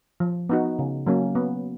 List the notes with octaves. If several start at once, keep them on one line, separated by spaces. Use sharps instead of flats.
F3
B3 D#4 F#4
C#3
F#3 A#3 C#4
B3